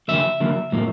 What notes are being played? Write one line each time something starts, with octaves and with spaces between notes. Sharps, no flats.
D3 F#3 A#3 E5
D3 F#3 A#3
A2 F#3 A#3